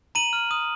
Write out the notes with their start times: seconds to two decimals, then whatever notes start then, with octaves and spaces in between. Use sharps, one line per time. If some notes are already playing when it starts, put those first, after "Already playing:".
0.15 A#5 D#7 F#7
0.33 F6
0.51 D#6